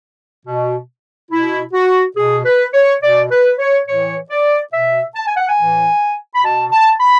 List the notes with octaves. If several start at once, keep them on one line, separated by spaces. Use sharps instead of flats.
B2
B2 E4
F#4
B2 G#4
B4
C#5
B2 D5
B4
C#5
A2 E3 C#5
D5
B2 E5
A5
G#5
F#5
G#5
A2 E3
B5
B2 A5
A5
B5